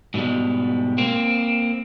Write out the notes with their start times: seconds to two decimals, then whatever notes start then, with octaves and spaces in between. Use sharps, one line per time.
0.14 G#2 B2 D3 G3 G#3
0.98 A#3 C4